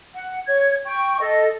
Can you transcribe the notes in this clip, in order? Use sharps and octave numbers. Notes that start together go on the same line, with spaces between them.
F#5
C#5 G#6
G5 C#6
A4 D#5